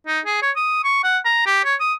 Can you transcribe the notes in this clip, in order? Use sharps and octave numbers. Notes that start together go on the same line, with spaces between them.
D#4
G#4
C#5
D#6
C#6
F#5
A#5
G4
C#5
D#6